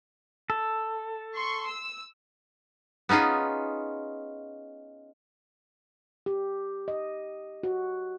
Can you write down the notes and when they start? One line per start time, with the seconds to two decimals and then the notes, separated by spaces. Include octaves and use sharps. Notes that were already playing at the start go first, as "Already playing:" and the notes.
0.50 A4
1.35 C6 C#6
1.67 E6
3.09 B3 C#4 D#4 F4 G#4
6.26 G4
6.88 D#5
7.63 F#4